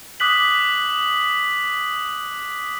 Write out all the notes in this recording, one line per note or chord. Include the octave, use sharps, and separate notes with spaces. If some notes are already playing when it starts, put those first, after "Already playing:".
D6 D#6 F#6 B6 F#7